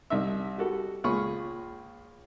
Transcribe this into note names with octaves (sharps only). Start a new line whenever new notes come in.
C2 D#4 E5
G3 F#4 A4
C#2 A#2 F4 G#4 B5 C#6